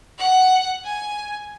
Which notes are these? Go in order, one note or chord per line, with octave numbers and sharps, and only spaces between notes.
F#5
G#5